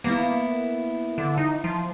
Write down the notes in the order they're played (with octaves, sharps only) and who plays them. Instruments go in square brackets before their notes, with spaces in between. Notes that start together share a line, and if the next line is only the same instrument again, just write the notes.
[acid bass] A#3 [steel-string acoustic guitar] B3 D4 E4
[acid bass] D3
D#4
F3